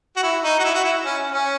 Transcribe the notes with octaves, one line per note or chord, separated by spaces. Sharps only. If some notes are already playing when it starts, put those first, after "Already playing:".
F#4
E4
D#4
F#4
E4
F#4
E4
C#4
C#4